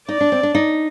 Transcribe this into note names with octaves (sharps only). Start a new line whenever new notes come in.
D#4 D5
D4
C4
D4
D#4